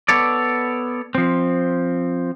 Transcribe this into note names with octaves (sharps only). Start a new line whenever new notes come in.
B3 A4 C#5 D5
F3 C4